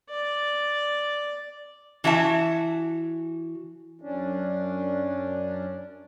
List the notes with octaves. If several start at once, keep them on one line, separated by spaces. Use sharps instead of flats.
D5
E3 F#4 E5 A5
F#2 C#4 D4